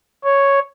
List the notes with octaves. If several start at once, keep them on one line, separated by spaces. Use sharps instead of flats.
C#5